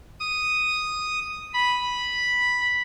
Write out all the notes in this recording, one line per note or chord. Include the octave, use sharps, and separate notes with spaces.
D#6
B5